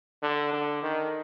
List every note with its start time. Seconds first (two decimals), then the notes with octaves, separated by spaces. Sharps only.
0.22 D3
0.53 D3
0.83 D#3